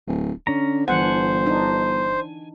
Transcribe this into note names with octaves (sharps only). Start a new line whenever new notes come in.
D1
D3 C#4 A#5
G1 E3 D4 C5 F#5 G#5
D4 D#4